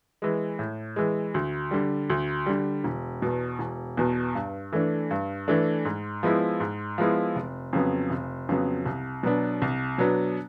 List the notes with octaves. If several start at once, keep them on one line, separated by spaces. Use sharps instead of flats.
E3 G#3
A2
E3 G#3
D2
D3 G3
D2
D3 G3
E1
E2 B2
E1
E2 B2
G2
E3 A3 D4
G2
E3 A3 D4
G#2
F3 G#3 B3 E4
G#2
F3 G#3 B3 E4
F1
F2 C#3 F#3 B3
F1
F2 C#3 F#3 B3
C2
B2 F#3 B3 D4
C2
B2 F#3 B3 D4